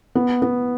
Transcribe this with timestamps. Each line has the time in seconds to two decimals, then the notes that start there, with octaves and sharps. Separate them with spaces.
0.15 B3
0.42 B3